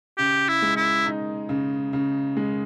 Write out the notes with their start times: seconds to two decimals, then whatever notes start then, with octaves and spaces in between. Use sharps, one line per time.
0.18 C#3 G4
0.48 E4
0.62 G#3
0.77 E4
1.06 D#4
1.49 C#3
1.93 C#3
2.37 G#3